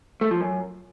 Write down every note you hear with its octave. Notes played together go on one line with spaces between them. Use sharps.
A3
F3
F#2